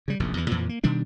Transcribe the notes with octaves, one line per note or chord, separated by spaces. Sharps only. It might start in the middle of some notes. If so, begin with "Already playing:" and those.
C#3 G3
F1 A#1 F#2
E2 E3
F2 A#2 E3 F3
A#3
B2 D#3 G3 D4